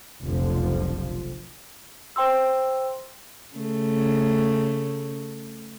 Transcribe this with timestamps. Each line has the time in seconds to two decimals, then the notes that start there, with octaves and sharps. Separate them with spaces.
0.22 F1 B1 F2 D3 F3
2.16 C5 G5 C6 E6
3.56 C#3 A3